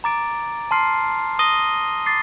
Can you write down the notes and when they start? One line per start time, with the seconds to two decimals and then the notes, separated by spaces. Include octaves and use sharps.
0.04 A#5 D6 A6 D7
0.71 A5 C6 F6 C7
1.39 D#6 A#6 D#7 G7
2.06 D6 A6 C7